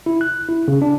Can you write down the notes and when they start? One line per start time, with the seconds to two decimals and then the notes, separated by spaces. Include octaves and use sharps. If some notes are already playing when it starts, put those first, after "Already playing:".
0.06 E4
0.21 F#6
0.49 E4
0.68 C#3
0.82 D4